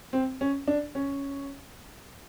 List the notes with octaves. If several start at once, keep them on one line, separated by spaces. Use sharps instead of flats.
C4
C#4
D4
C#4